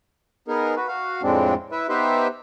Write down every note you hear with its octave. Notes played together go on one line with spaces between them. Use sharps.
B3 D#4 G#4 A#4
F#4 B4
F#4 F5
F2 A2 G#3 C4 D4
E4 B4 E5
B3 D#4 G4 B4 C5 E5